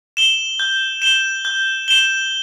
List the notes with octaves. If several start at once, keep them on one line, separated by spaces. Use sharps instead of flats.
E7 G7
G6
E7 G7
G6
E7 G7